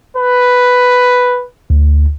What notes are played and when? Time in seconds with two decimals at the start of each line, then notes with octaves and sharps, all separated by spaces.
0.17 B4
1.70 D2